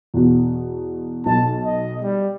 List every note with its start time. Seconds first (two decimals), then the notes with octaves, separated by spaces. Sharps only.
0.14 E2 B2
1.26 B1 A5
1.65 D#5
2.02 G3